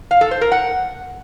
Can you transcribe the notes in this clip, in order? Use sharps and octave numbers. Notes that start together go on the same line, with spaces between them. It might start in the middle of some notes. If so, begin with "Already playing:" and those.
F5
A4
C5
A#4
F#5